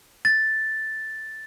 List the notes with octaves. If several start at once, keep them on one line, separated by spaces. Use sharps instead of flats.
A6